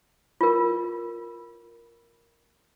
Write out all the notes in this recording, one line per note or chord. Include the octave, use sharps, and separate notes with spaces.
F4 A#4